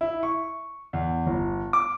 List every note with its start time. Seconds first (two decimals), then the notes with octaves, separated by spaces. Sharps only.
0.01 E4
0.23 C#6
0.93 E2
1.27 G1
1.73 D6